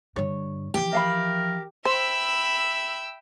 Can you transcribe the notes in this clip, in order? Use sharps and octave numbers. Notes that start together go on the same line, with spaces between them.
G2 D3 C#5
E3 F3 G4
A#4 E5 F5 B5
C5 E5 G5 B5 E6